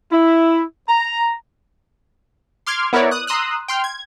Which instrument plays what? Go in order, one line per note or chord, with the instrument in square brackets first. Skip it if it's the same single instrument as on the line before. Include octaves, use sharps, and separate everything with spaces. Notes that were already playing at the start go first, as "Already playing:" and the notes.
[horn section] E4
A#5
[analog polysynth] C6 D6 F6 G#6
B3 E4 A#4 B4 C#5 D5
D#6 F#6
A#5 C6 D#6 E6 F#6
G5 C6 F6
G#6